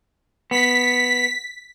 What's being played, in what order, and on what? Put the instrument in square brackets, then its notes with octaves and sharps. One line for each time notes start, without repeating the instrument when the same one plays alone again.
[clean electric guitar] B3 [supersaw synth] B6